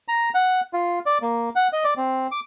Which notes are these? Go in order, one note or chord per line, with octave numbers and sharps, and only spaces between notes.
A#5
F#5
F4
D5
A#3
F#5
D#5
D5
C4
D6